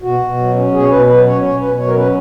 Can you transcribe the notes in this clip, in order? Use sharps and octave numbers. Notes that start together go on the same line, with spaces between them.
B2 F#4
B2
F#3
C#4
B2 G#4
C#5
B2 B4
F#3 B4
C#4 C#5
B2 C#5
B2 B4
F#3 C#5
A#4
C#4 B4